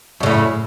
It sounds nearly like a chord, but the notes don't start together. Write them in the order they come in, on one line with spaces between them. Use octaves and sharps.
F#2 C#3 A2